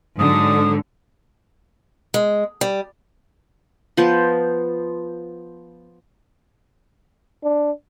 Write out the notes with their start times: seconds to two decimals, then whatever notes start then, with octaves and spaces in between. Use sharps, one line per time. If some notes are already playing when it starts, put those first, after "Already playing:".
0.19 G#2 D3 F#3 D#6
2.14 G#3
2.61 G3
3.97 F3 B3 C5
7.43 D4